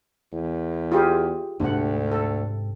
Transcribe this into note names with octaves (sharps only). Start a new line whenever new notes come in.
E2
F4 G4 G#4
D2 G#2 C3 C4 D4 F#5
A4